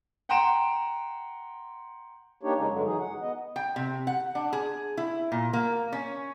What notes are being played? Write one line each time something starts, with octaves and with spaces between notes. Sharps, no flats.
F#5 G5 A#5 C6 D7 E7
A#3 D4 D#4 G4 C#5
F2 C#3 G#3 C#4 D#4
G2 D3 F#3 G#3
E3 F#3 D#4 G#4
F#5
B3 D#5
G5
C3
F#5
D4
G#4
E4
A#2
A#3
C#4